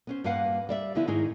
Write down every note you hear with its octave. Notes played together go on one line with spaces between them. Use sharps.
B3 C#4 C5
G2 A#3 B4 F5 F#5
G3 D5 E5
D3 F3 B3 E4
G#2 D#3 D#4 G#4